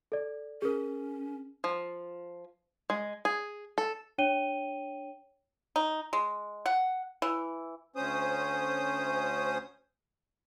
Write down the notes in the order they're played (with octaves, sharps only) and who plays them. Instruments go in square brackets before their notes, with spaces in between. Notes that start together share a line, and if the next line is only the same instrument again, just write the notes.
[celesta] A4 D5
[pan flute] C#4 [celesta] G#4 A#4
[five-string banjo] F3
G#3
G#4
A4
[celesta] D4 C#5 G5 D#7 G7
[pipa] D#4
G#3
F#5
E3
[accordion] D2 C#4 C5 D#6